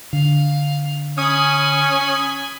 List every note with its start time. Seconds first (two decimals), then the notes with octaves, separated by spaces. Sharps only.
0.13 D3 F5
1.18 C#4 G#5 B5 D#6